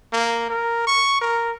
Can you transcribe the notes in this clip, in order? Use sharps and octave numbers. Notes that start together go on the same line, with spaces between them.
A#3
A#4
C#6
A#4